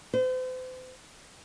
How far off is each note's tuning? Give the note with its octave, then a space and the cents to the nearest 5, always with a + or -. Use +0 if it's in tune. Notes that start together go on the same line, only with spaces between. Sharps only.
C5 -40